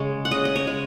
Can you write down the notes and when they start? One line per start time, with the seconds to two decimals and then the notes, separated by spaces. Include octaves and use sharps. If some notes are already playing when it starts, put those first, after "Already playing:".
Already playing: C#3 G#3 G#4 C#5
0.25 F#5
0.31 C#3 D#5
0.45 D#5
0.56 C#5
0.67 G#3